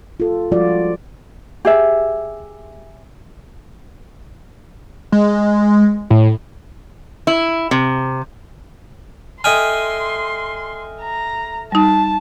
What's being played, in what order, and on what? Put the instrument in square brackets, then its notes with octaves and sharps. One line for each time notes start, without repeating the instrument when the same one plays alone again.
[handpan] F4 A4
F3 G3 G#3 F4 F#4 D5
[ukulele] G4 G#4 E5
[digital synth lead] G#3
A2
[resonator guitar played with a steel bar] E4
C3
[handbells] A4 E5 F6 [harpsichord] D#5 G5 G#5 [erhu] C6
[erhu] A#5
[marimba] G3 D#4 [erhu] A5